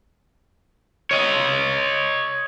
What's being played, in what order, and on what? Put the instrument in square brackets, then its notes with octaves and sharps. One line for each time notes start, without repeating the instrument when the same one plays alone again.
[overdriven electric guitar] C#5 D#5